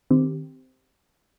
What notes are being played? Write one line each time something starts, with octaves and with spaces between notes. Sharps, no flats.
D#3 C4 G4